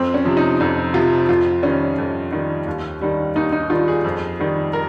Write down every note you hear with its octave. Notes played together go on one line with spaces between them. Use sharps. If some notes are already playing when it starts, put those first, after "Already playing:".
Already playing: F2 C4
C#4
C3 F3
D#4
F2 D#4
C3 F3 F4
F2 F4
D#3 G3 C#4
F2
D#3 G3
D#2
D#3 G3
D#2 D#4
D#4
D#3 G3 F4
G#4
F2
D#3 G3
A#4